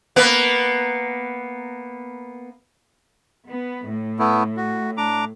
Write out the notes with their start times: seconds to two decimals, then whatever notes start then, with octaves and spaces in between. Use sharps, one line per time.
0.16 A#3 B3 B4
3.48 B3
3.88 A2
4.19 A3 B3 E4
4.57 F#4
4.97 D4 A#5 D6